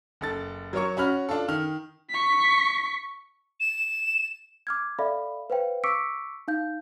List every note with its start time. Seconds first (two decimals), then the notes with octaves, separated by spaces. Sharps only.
0.21 F#1 A4 A6
0.73 F#3 A#4 C#5 C#6
0.97 C#4 F#4 B5 F6
1.29 D4 F4 A4
1.48 D#3 F6
2.11 C#6 B6
3.60 E7
4.67 D6 F6 G#6
4.99 A4 D5 E5 F5 B5
5.50 B4 C5 F5 G5
5.84 C#6 D6 E6 B6 C#7 D7
6.48 D#4 F5 G6